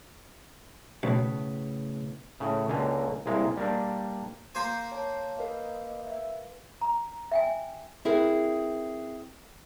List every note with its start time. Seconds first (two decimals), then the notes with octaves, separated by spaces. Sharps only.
1.03 B1 A2 C#3 B3
2.40 A2 C#3
2.68 C#2 D3 A#3 G#5 A#5
3.26 C2 G#3 A#3
3.57 G3 A#3 D4
4.55 A#3 C5 G#5 A#5 C6
4.92 C#5 A5
5.38 A#4 B4 D#5 F5
6.04 E5
6.81 A#5
7.32 E5 G5 G#5
8.05 C4 E4 G#4 A#4 B4